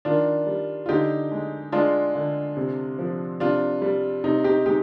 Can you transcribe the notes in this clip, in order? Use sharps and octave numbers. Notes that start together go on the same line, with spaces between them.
D#3 D4 F4
G3
F4
D3 D#4 G4
G#3
G#3 D4 F4
D3
C3
F3
C3 D4 F4
G3
C3 D#4
D#4 G4
G#3 D#4 G4